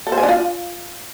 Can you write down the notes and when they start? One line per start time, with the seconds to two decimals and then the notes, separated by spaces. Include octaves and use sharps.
0.07 A4
0.12 C5
0.18 G#5
0.23 D4
0.29 F4